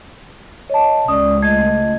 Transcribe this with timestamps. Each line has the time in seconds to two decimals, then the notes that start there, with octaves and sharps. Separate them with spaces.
0.70 C#5 D#5 A5
1.08 C#2 C#4 D5 D#6
1.42 A3 D#5 G#6